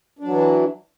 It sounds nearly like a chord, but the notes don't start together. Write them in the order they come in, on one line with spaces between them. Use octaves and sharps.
D4 F#3 E3